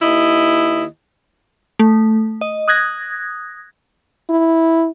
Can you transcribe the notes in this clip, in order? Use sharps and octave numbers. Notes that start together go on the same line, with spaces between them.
D#2 E4 D#5
A3
D#5
D#6 F#6 G#6 A#6
E4